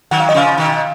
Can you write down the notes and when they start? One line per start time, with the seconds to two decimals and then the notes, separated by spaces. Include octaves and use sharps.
0.11 D#3 F#3 F#5
0.20 F5
0.29 F#3 D#5
0.34 C#3 F3 F5
0.57 B2 D#3